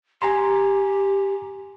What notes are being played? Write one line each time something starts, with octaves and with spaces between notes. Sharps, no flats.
G4 G#5 A#5 C6